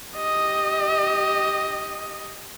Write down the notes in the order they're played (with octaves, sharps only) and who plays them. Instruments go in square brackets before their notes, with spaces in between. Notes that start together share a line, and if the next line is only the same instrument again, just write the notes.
[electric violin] G4 D#5